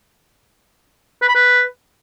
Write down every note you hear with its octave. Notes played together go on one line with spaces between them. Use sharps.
B4
B5
B4